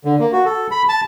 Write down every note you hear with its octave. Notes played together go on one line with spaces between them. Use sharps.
D3
A#3
F#4
A4
B5
A5